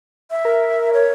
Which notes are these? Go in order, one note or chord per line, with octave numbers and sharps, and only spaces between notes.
E5
A#4
C#5